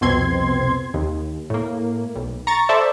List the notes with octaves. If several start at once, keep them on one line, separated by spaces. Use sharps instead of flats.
C2 F2 B2 C4 C6 G#6
D#2
A2 A#3
B1
A#5 C#6 A6
A4 C5 D5 E5 A5